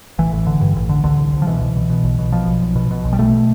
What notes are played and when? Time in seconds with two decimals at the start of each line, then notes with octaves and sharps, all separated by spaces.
0.18 A1 E3
0.33 A1
0.47 D3
0.61 G2
0.76 A1
0.89 D3
1.04 C2 D3
1.18 C2
1.33 C2
1.42 F3
1.47 B2 E3
1.61 C2
1.76 B2
1.90 B2
2.04 B1
2.19 B2
2.32 B2 F3
2.47 B1
2.62 B1
2.76 B2
2.91 B2
3.05 B1
3.13 G3
3.19 B2 A3